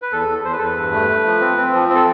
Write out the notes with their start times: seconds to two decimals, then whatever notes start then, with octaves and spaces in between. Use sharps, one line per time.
0.02 B4
0.12 E2 A4
0.29 E2
0.45 E2 C5
0.52 B4
0.59 E2 A4
0.65 B4
0.77 G2
0.93 A3
1.09 A3
1.25 F3
1.40 C4
1.57 C4
1.73 F3
1.89 C4
1.95 A4